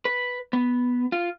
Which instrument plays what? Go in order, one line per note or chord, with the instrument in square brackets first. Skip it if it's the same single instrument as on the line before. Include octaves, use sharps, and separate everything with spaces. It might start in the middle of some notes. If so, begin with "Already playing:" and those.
[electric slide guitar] B4
B3
F4